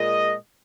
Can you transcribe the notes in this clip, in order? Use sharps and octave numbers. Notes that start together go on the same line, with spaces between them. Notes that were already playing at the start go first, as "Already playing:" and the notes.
Already playing: A#2 G#3 D#5